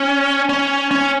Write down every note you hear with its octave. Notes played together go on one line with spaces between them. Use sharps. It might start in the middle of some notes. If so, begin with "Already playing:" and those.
Already playing: C#4
C#4
C#4